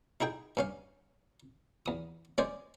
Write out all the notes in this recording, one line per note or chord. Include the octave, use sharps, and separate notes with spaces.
D#4 E4 G#4 G5
G2 C#4 F5
E2 D#6
G#3 C#4 G#4 C5 D5